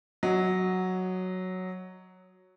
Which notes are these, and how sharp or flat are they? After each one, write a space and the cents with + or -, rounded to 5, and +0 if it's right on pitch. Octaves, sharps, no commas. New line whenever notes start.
F#3 +0 D#5 +0